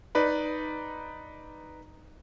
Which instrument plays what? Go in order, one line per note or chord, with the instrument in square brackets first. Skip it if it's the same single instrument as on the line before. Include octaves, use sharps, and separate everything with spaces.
[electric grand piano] D#4 B4 D5 B5